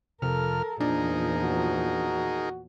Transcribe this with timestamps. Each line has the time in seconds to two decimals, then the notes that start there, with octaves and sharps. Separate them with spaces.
0.22 F2 C3 A4 A#4 F6
0.81 E2 A#2 F3 D4 D#4 G#4 A#4
1.44 F#4